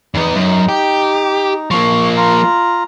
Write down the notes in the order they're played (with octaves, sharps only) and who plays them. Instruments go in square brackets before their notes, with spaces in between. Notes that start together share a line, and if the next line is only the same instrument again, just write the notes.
[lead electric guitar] E2 B3 [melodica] D#4
[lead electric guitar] F#2
G4
[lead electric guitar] F3 A#3 [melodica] C#6
[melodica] F4 A#5